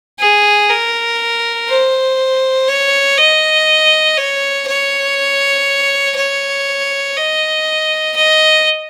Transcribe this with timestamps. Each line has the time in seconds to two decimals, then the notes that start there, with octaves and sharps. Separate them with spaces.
0.19 G#4
0.69 A#4
1.68 C5
2.68 C#5
3.18 D#5
4.17 C#5
4.67 C#5
6.16 C#5
7.16 D#5
8.16 D#5